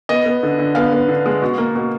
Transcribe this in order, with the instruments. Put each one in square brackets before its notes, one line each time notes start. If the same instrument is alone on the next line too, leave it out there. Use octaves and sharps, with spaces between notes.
[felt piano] B3 D#5
B3
D3
D3
B3 F5
B3
D3
G#3
B2
A#3
B2